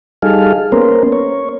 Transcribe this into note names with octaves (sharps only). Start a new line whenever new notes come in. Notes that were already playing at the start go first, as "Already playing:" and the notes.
G3 D#4 G#4 A4 F5
A#3 B3 C#4 A#4 C5
C#5